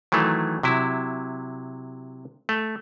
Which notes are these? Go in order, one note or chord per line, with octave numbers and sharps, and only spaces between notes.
D#3 E3 F#3 A3
C3 F#3 E4
A3